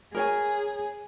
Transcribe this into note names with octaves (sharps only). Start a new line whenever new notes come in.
G#4 A#4 C#5 G#5